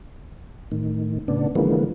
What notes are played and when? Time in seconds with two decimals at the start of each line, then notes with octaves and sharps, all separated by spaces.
0.72 A2 D#3
1.28 A2 C#3 B3 D4
1.55 D3 E3 F3 G#3 A#3 B3